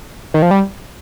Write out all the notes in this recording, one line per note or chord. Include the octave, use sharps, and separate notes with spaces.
D#3
F3
G3